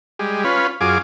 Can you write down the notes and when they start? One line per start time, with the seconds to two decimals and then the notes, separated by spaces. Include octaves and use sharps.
0.19 G3 G#3
0.44 C#4 F4 B4
0.81 F#2 F4 G#4 D6